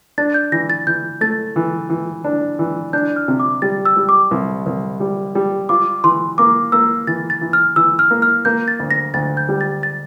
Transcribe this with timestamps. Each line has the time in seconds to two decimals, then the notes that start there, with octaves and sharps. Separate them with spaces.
0.18 D4 A6
0.34 G6
0.52 E3 A#6
0.70 A6
0.87 E3 G6
1.21 A3 A6
1.56 E3
1.90 E3
2.24 D4
2.59 E3
2.93 D4 G6
3.16 F6
3.28 C3
3.40 D6
3.62 G3 A6
3.85 E6
3.97 G3
4.09 D6
4.31 C2
4.66 C2
5.00 G3
5.35 G3
5.69 F4 D6
5.98 D6
6.04 E3 C6
6.38 A#3 D6
6.72 A#3 E6
7.07 E3 A6
7.30 A6
7.41 E3
7.53 F6
7.76 E3 E6
7.99 F6
8.11 A#3
8.22 F6
8.45 A#3 G6
8.68 A6
8.80 D2
8.91 A#6
9.14 D2 A6
9.37 G6
9.49 G3
9.61 A6
9.83 A6